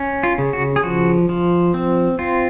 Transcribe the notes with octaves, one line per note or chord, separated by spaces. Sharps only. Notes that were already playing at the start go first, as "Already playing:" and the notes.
Already playing: C#4
F4
C#3
F#4
G#4
F3 F#4
F3
C4
C4 F4